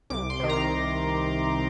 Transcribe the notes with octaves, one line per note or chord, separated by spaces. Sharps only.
C2 D6
C6
C3 D#3
A#5